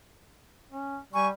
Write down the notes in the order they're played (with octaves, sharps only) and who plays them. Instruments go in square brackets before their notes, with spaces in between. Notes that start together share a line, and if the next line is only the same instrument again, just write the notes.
[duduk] C#4
[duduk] G3 [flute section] G#5 C#6